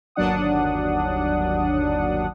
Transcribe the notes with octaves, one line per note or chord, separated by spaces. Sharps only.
G1 D#2 F#3 D4 F#5 D#6